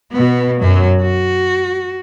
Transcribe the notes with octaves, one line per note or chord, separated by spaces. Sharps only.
B2 B3
F#2 F#3
F#4